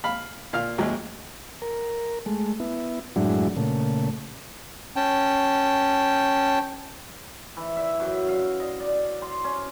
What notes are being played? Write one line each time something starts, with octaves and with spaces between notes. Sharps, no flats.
F5 B5
A#2 F5 F6
A1 D#2 F#3 G#3
A#4
G#3 A3
B3 E4
F#2 A2 F#3 G#3 D4 E4
A#2 C#3 A3
C#4 G5 A5
E3
E5
F#2
F5
D#5
D5
C6
C#4